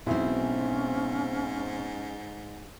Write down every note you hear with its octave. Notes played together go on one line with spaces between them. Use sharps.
B1 G#2 B2 C4 C#4 E4 G#4